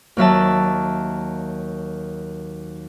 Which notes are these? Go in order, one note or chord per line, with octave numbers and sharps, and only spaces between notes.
D#2 F#3 E5 A5